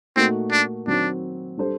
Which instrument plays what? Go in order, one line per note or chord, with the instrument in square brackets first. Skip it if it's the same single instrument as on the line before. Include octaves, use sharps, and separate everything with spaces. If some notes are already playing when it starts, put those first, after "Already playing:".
[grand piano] A#2 A3 D#4 F#4 A#4 [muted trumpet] C4
[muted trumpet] D4
[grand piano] D#3 F#3 C4 [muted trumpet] D4
[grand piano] G3 D4 A4 C5